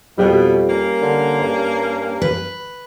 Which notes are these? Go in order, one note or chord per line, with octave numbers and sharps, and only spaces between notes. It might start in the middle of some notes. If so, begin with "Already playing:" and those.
F2 B2 G3 G4
A#3 C#4 A#4
D3
G2
B4